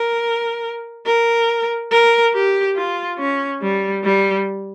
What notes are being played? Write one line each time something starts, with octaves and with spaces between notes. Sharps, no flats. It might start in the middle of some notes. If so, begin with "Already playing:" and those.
Already playing: A#4
A#4
A#4
G4
F4
C#4
G3
G3